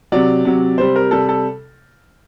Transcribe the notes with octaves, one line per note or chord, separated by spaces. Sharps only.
C3 F#3 D5
C3 F#3
C3 G3 C5
A#4
C3 G3 A4
A4